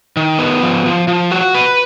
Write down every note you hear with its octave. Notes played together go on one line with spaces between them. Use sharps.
D#3
B3
F3
F3
F3
F#4
B4